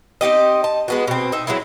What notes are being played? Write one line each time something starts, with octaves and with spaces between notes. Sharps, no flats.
C4 D#4 G4 D#5
A5
G#3 B3 F#4
B2 C4
D#4 E5
F#3 G#3 C4 E4